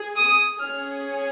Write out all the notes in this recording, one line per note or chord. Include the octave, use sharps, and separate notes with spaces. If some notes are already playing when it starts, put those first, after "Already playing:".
Already playing: G#4
D#6
C#4 G#4 F6